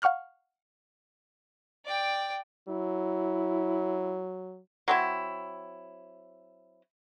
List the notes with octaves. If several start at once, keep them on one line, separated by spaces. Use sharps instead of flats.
F5 F#5 C#6 F6 F#6
D5 G5
F#3 E4
F#3 C4 E4